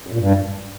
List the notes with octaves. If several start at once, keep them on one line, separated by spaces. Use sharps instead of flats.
F#2
A#2
G2